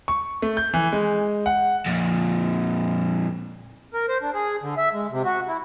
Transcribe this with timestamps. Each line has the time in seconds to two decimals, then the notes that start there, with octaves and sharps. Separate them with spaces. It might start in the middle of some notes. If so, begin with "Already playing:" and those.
0.08 C#6
0.42 A3
0.57 G6
0.74 E3
0.93 G#3
1.46 F#5
1.86 F2 A#2
3.94 A#4
4.08 C5
4.22 D4
4.34 G#4
4.62 D3
4.77 E5
4.93 G#3
5.11 C3
5.25 F#4
5.48 E4